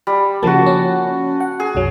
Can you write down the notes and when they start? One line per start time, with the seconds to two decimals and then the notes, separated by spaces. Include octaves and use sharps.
0.07 G3
0.43 C#3 F3 A#3 F#4 A5
0.66 C#4
1.40 F#5
1.60 G#4
1.75 C2 F#2 F#3